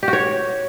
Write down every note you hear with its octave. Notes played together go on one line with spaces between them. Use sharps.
G4
F#4
C#5